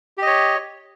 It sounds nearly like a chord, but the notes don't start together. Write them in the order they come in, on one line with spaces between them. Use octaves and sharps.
G4 D#5 C#5